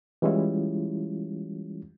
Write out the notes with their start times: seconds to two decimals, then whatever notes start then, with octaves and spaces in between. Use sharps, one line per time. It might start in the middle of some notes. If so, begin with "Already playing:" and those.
0.22 E3 G3 G#3 C#4 E4 F4